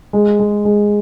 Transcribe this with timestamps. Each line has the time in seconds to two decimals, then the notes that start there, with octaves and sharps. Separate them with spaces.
0.13 G#3
0.39 G#3
0.65 G#3